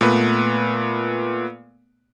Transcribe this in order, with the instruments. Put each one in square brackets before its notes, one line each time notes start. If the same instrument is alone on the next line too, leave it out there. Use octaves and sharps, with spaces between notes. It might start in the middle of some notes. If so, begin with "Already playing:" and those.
[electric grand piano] A#2 A3 B3 B4